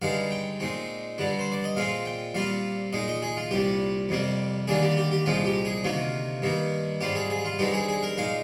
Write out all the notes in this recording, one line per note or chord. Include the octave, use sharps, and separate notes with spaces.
G2 D3 G#3 D#4 F5
G5
A#2 G#3 C4 D#4
G2 D3 G3 D4
C5
D5
D#5
A#2 G#3 C4 F4 F5
G5
A#2 G3 C4 F4 F5
A#2 G#3 D#4 D#5
D#5
G#4
F4
C2 A#2 G3 G4
F2 C3 G3 A#3
D#2 D3 G3 A#3 D4 G#4
G4
G4
G4
C2 A#2 F3 G#3 D#4 F4
G4
G#4
D2 C3 D#3 A#3 F4
G2 D#3 A#3 D#4
G#2 G3 C4 F4 G4
G#4
G#4
F4
G2 D3 G#3 C4 D#4 G4
G#4
G#4
A#4
A#2 G#3 D#4 F5